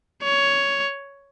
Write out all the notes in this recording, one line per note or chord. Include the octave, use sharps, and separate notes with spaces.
C#5